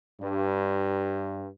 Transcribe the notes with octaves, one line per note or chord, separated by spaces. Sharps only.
G2